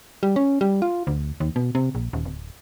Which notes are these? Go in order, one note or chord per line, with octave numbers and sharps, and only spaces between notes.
G3
C#4
G3
F4
D2
D#2
B2
C3
A#1
D#1
D1